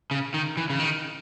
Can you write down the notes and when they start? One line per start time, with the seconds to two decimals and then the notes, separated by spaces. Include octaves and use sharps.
0.11 C#3
0.34 D#3
0.57 E3
0.70 C#3
0.79 D#3